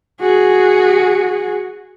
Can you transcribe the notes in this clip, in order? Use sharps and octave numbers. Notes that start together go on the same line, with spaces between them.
F#4 G#4